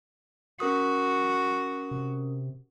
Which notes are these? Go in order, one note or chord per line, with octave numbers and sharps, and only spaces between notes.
C#4 F#4 A#4 D#6
C3